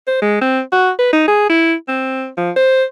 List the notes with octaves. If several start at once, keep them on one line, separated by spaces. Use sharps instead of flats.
C5
G#3
C4
F#4
B4
D#4
G#4
E4
C4
F3
C5